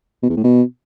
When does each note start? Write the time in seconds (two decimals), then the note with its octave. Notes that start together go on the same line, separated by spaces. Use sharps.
0.23 B2
0.30 E2
0.37 A2
0.44 B2